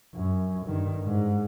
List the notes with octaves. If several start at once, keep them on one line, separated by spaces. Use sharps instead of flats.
F#2
G2 D#3
G#2